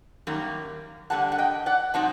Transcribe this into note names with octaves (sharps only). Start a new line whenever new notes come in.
F#2 D#3 G3 A#3
D3 G3 A#3 F#5 A5
F#5
D#5 G5
D5 F#5
C3 F#3 C4 D#4 F#5 A5